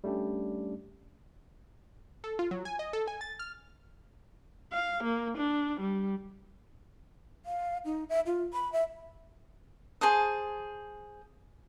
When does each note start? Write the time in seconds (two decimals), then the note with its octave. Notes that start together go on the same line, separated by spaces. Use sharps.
0.04 G3 A3 C#4 D4 G4
2.24 A4
2.39 F4
2.51 F#3
2.65 G#5
2.79 D#5
2.93 A4
3.08 G#5
3.21 A6
3.39 F6
4.72 F5
5.04 A#3
5.38 D4
5.80 G3
7.46 F5
7.85 D#4
8.09 E5
8.26 F4
8.53 B5
8.73 E5
10.01 G#4 C5 A5 D#6